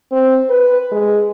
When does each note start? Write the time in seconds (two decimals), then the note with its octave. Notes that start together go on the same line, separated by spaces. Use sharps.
0.12 C4
0.50 B4
0.92 G#3